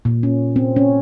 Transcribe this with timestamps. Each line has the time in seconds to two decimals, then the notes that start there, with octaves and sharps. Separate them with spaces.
0.05 A#2
0.23 C#4
0.56 C4
0.76 C#4